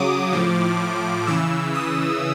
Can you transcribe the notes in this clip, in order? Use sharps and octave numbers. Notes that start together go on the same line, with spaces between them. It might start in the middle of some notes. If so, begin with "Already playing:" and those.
Already playing: C#3 F#3 D6 D#6
A2 F3
C#3 E3 E6
D#6